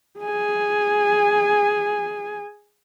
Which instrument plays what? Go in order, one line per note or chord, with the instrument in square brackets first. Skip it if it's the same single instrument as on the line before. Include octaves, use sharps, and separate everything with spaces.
[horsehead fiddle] G#4 G#5